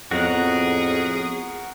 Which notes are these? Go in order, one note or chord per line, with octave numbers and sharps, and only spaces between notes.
F2 A2 B3 F#4 G#4 A#4 F#5